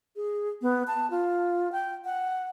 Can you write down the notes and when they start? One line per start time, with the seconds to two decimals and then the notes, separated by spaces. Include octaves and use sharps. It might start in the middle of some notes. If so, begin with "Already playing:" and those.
0.16 G#4
0.62 B3
0.87 A5
1.11 F4
1.72 G5
2.05 F#5